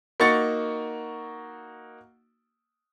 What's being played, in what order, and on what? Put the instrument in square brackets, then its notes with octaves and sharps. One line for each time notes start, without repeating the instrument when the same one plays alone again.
[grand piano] A#3 D#4 F#4 C#6 A6 C#7